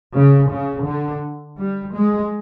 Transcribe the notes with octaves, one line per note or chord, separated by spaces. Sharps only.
C#3
C#3
D3
G3
G#3